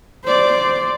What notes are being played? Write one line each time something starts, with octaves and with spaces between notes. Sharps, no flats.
C5 D5